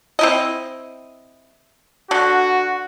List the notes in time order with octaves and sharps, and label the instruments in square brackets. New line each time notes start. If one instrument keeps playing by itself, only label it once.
[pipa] C4 E4 D#5
[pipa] D3 [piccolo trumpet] F#4